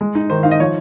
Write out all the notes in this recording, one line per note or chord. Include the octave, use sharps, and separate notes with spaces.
G#3
D#4
D#3 C5
D#4 F5
D#5
F3 C#5